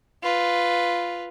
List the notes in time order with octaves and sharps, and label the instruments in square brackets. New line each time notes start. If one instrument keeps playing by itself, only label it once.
[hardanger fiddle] F4 B4